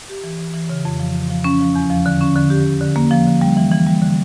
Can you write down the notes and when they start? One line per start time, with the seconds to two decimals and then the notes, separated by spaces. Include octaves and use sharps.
0.09 G4
0.24 E3
0.39 E3
0.54 E3
0.70 C#3
0.85 F2
1.00 F3
1.15 C#3
1.30 F3
1.44 C#4
1.61 F3
1.76 E2
1.90 F3
2.06 D3
2.21 C#4
2.36 D3
2.50 G4
2.65 D3
2.80 D3
2.96 A#3
3.11 F3
3.27 D3
3.41 G3
3.57 E3
3.72 E3
3.87 G3
4.02 D3